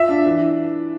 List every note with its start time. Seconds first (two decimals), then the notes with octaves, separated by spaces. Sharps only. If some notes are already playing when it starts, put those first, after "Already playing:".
Already playing: F4 E5
0.09 D4
0.26 E3